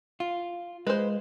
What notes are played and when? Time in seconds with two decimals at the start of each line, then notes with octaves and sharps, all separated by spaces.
0.20 F4
0.87 G#3 B4 C5